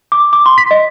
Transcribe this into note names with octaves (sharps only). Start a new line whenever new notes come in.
D6
D6
C6
B6
D#5